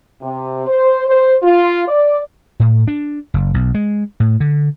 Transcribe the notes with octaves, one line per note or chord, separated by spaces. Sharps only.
C3
C5
C5
F4
D5
A2
D4
F#1
B1
G#3
A2
D3